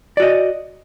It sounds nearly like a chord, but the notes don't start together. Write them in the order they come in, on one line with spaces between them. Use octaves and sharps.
D5 F#4 D#5